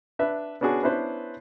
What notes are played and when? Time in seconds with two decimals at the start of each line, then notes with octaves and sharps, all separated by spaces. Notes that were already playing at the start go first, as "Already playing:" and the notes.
0.19 D4 B4 E5
0.61 B3 C#4 D4 F#4 G#4
0.83 B3 C#4 D4 E4 B4 C5